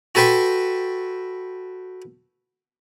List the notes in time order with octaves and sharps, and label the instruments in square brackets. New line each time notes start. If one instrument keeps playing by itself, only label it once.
[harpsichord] F#4 A4 B4 G5 C6 C#6